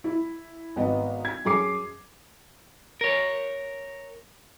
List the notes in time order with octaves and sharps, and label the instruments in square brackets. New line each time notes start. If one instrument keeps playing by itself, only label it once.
[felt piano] E4
G#1 B3 D#5
G#6
F#2 G#4 D6 C7
[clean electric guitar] A#4 C#5